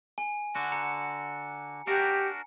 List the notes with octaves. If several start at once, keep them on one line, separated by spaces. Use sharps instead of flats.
G#5
D3 F#4
A#5 C#7
D4 F#4 G4 A#4